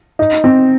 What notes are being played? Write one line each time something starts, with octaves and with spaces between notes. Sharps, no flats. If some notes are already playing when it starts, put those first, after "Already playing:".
D#4
C4